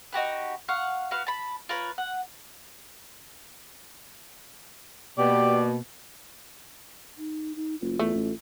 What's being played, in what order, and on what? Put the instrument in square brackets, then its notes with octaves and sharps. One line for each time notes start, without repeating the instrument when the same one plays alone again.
[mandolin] D#4 F#4 G4 B4
F5 F#5 C#6 F6
F#4 B4 F5
A5 B5
F4 A#4 B4 C#5
F#5
[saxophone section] B2 [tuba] A#3 [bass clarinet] G4 [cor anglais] D5
[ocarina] D#4
D#4
[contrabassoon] F#1 [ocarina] F4
[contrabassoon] E2 [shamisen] A3
[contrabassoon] A1